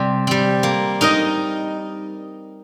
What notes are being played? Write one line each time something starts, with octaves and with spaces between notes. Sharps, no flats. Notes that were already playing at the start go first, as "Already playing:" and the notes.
Already playing: C3 G3 C4
G3 C4
A#3
D#4 A#4 D#5